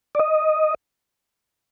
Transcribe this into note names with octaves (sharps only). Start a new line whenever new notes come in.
D5
D#5